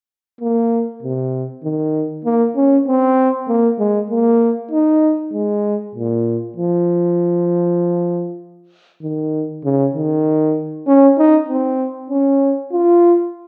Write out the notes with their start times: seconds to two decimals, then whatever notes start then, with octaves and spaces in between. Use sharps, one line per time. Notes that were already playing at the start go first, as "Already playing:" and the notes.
0.41 A#3
1.03 C3
1.64 D#3
2.25 A#3
2.56 C#4
2.87 C4
3.48 A#3
3.79 G#3
4.10 A#3
4.71 D#4
5.33 G#3
5.95 A#2
6.57 F3
9.02 D#3
9.64 C#3
9.94 D#3
10.87 C#4
11.18 D#4
11.48 C4
12.10 C#4
12.72 F4